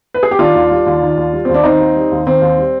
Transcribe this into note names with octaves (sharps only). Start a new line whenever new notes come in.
B4
G#4
G4
D#3 D4 F4
D#2
G3
D#2
D#3
D#2
G3
D#2 C4
D4
D#3 C4 D#4
D#2
G3
D#2
D#3 C4
D#2
G3